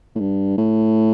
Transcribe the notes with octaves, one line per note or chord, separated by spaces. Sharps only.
A2
G2
A2